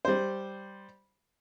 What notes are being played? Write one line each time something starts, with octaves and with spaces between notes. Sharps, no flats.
G3 C5